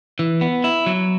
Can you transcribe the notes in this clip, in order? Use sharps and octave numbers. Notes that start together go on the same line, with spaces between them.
E3
B3
E4
F#3